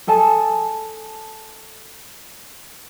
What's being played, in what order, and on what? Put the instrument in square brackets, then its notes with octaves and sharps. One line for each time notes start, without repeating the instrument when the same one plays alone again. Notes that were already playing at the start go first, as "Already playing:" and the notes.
[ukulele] G#4 A4 G#5 A5